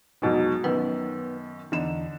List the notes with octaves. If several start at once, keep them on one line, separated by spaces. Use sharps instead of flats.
F1 G#2 B2 F#3
F#2 D#3 B3
E2 D3 D#4 E7